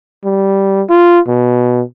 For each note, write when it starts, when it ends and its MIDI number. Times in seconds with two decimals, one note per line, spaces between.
0.24 0.82 55
0.90 1.19 65
1.28 1.82 47